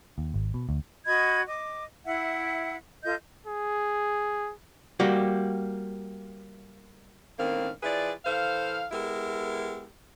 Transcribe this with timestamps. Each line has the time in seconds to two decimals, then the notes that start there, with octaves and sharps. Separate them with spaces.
0.18 D#2
0.34 G#1
0.54 B2
0.69 D2
1.06 F#4 D#5 B5 G#6
1.46 D#5 D6
2.06 E4 E5 F#5
3.04 F4 A4 D#5 G6
3.46 G#4
5.00 G3 A#3 F#4 G4
7.38 A2 D#3 A#3 C4 C#4 F5
7.83 F3 E4 G#4 B4 D5
8.25 E3 A4 C5 F5
8.92 G#3 B3 E4 G4 A4 A#4